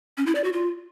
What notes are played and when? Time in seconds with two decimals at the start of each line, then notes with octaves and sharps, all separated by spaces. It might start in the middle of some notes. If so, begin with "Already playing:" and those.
0.18 C#4
0.26 E4
0.35 D5
0.44 F#4
0.53 F4